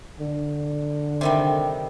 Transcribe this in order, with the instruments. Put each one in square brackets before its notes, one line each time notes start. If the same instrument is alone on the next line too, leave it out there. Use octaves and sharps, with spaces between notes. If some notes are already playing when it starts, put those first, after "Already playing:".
[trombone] D3
[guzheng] C3 D#3 G3